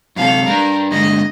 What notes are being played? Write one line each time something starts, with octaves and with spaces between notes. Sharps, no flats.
F#2 C3 A4 F5
G3 D4 A#4
G2 D3 G#3 D#5